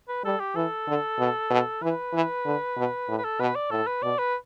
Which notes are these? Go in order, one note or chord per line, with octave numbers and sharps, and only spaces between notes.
B4
G3 A4
G4
E3 A4
D3
B2
B2
E3 B4
E3
D3
B2
A2
B4
A4
B2 B4
D5
A2 A4
B4
B2 D5
B4